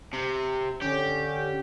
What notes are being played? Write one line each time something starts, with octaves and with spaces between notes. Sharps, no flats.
C3
D3 C#4 G4